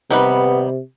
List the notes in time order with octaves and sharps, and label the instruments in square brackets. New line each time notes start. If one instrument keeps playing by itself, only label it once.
[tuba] C3 [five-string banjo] D#3 G3 B4 [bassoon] B3